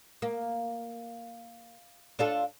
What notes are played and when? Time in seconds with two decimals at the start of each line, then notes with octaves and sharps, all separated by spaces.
0.22 A#3
2.19 D4 F4 A4